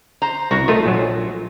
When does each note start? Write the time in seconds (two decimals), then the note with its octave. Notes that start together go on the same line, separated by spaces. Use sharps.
0.22 C5 A#5
0.51 C2 F#4 A#4
0.68 D#3 A3 F4
0.86 A#1 F#3